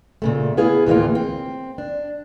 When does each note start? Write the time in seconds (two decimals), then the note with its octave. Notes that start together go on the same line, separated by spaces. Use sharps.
0.22 A#2 C#3 A3
0.57 B3 E4 G#4 F5
0.86 D2 A2 E3 A3 A#3 F4
1.15 C4
1.78 D4